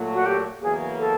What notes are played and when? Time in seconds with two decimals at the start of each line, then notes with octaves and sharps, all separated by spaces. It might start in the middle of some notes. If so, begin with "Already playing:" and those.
Already playing: A#2 F#3 A3
0.14 F#4
0.26 G4
0.62 E2 C#3 F#3 A#3 G#4
0.99 A4